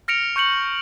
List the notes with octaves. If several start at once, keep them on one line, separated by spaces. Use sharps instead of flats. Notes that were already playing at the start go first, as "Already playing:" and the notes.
F6 A#6 C#7 D7 F7
C#6 G6 C#7 F#7